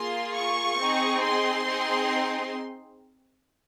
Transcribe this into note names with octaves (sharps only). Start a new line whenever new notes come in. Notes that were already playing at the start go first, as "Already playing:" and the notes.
Already playing: A#3 F4 G#4 C6
C#6
C4 D#4 G#4
C6
C4 D#4 G#4